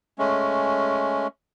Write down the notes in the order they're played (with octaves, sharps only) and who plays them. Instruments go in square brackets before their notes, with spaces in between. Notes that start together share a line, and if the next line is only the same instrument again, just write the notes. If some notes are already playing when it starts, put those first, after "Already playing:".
[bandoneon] G#3 A3 C#4